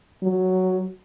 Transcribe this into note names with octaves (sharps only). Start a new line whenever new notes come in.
F#3